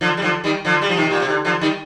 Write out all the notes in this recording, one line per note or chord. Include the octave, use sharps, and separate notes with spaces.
D3 F3
G3
D3 F3
D#3 G3
D3 F3
G3
F3
C3 D#3
A#2
C3
D3
D3 F3
D#3 G3